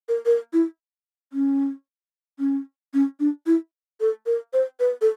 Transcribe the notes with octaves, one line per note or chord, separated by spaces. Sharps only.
A#4
A#4
E4
C#4
C#4
C#4
D4
E4
A4
A#4
C5
B4
A4